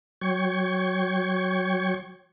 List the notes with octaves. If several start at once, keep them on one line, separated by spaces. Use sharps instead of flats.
F#3 C#5 G5 C#6 G#6